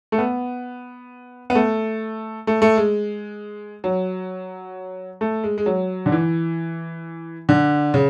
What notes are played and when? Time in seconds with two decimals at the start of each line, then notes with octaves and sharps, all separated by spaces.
0.12 A3
0.18 B3
1.50 B3
1.55 A3
2.47 A3
2.62 A3
2.77 G#3
3.84 F#3
5.21 A3
5.44 G#3
5.58 G#3
5.66 F#3
6.06 D3
6.12 E3
7.49 D3
7.94 C#3